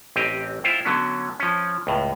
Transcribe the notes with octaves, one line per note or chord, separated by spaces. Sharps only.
A1 C4 G4 D#5
E4 F4 C5 F5 G5
D3 F#3 B3 C#4
F3 C#4
C#2 A2